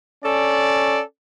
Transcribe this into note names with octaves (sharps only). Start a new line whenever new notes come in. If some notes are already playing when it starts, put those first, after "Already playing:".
C#4 A4 D5